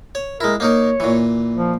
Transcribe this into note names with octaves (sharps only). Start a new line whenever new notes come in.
C#5
G#3 E4 A#4
A#3 D#4 A#4 C#5
A#2 E3
F3